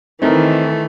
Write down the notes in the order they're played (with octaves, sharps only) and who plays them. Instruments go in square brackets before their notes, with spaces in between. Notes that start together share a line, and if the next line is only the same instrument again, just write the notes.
[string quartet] D#3 E3 [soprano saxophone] A3 [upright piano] C4 D#4 A#4